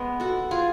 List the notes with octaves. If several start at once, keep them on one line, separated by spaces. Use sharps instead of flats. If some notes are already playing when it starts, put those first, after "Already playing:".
Already playing: G#3 B3
F#4 A4
F4 G#4